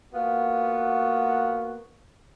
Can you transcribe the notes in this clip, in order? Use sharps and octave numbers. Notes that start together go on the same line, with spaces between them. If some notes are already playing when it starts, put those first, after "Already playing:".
A#3 B3 F4 F#4